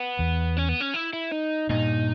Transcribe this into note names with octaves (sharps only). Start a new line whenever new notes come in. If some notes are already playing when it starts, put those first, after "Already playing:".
Already playing: B3
E2
C#4
B3
C#4
E4
E4
D#4
G2 A#2 D#4